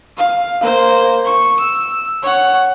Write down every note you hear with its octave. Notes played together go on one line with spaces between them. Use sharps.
F5
A#3 C5
C#6
E6
C#5 F#5